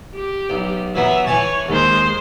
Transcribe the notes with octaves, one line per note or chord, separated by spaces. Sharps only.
G4
B1
E3 F#3 B3 E5
E3 C#5 G#5 A5
D#2 G#3 C5